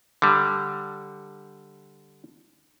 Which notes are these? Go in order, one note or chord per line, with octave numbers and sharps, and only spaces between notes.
D3 G3